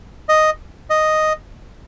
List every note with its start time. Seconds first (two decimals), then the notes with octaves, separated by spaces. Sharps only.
0.29 D#5
0.90 D#5